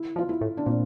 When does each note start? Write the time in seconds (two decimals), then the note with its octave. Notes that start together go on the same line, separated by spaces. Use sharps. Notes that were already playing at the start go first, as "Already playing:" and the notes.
Already playing: E4
0.16 F3 F4
0.29 E4
0.41 A2
0.57 D4
0.66 A#2 C4